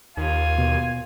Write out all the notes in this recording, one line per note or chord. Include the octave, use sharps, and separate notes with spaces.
D#2 F4 G#5
B2